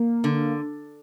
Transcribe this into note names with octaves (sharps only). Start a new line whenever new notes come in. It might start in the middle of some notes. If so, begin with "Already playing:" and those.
Already playing: A#3
D3